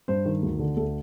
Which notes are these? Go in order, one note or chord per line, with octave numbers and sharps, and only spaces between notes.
G2 C5
D#3
D2
D3
D2 A4